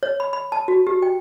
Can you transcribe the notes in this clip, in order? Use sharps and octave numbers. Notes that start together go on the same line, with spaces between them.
C#5
B5
B5
A5
F#4
G4
G5